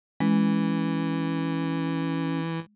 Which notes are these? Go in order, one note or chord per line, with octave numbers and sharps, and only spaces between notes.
E3 G#3 C#4